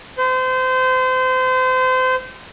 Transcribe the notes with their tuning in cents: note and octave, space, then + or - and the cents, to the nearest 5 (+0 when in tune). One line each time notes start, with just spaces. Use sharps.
C5 -30